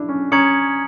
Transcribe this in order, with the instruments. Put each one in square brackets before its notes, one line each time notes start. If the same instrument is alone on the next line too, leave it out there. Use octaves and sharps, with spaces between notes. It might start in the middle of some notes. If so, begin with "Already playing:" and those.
Already playing: [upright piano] D4 E4
C#4
[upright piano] C#4 [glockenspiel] A#5 D#6 G#6 C#7 F#7